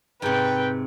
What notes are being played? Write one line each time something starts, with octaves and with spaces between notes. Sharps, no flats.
G#2 C3 B4 G5